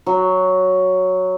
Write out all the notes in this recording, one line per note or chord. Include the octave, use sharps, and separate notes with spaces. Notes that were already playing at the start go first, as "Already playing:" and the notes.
F#3